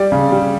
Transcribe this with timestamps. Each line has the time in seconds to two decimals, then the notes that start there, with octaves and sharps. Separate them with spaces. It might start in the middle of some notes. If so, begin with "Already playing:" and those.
Already playing: G3 D5
0.12 C#3
0.32 G3